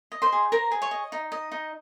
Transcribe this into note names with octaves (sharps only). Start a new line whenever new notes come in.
D#5
C5 C6
G#4
A#4 C5 A#5
G#4
C#5 C#6
D#5
D#4
D#5
D#4